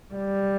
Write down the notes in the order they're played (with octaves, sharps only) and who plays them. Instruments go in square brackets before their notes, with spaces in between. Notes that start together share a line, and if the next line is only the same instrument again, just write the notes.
[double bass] G3